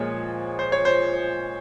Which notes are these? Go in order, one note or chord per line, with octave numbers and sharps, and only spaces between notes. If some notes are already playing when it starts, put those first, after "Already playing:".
Already playing: A#2 F3 G#3 C#5
C5
C#5
C5